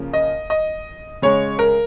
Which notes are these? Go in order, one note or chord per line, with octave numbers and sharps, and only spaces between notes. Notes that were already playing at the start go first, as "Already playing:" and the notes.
Already playing: C#3 F3 A#3
D#5
D#5
C#3 G#3 C#5
A#4